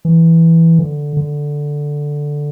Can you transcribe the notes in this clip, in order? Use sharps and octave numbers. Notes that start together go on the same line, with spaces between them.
E3
D3
D3